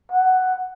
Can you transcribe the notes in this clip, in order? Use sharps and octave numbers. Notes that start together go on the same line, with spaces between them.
F#5